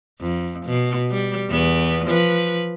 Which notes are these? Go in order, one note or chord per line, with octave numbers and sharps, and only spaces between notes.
F2
B2
G3
E2 B3
F3 B4